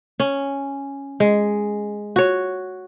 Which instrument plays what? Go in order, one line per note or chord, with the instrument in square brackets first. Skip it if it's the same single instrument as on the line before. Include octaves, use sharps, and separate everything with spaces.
[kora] C#4
G#3
F#4 C#5